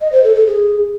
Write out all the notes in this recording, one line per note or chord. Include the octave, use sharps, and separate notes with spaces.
D#5
C5
A4
A4
G#4